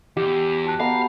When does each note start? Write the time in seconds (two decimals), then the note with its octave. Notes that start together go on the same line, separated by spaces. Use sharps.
0.17 E2 G4
0.65 F#4 A5 F#6
0.80 B3 F5 A#5